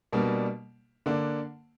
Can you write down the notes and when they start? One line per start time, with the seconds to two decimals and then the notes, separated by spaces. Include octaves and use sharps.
0.12 B2 G3 A#3 D4
1.06 D3 A#3 D4